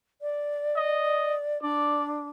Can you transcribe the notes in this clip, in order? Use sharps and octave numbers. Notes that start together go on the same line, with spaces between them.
D5
D#5
D4 D5